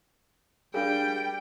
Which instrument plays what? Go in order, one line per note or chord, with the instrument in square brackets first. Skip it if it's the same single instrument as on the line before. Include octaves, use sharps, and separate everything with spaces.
[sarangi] G3 [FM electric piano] D4 G#4 [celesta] F#4 A#4 F5 [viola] G5